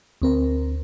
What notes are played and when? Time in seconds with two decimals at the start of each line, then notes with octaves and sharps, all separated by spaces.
0.22 D2 C4 A#4